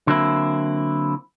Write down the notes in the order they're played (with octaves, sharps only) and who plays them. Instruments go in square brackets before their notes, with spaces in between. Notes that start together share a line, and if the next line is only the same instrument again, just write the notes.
[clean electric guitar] D3 F#3 A#3 C4 E4